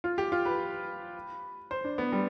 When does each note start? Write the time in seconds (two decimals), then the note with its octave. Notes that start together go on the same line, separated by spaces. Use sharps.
0.04 F4
0.18 G4
0.32 F4
0.45 B4
1.71 C5
1.84 D4
1.98 B3
2.12 G3